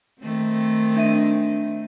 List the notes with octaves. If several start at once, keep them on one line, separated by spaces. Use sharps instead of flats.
D#3 A3 C4
D4 E5 D#7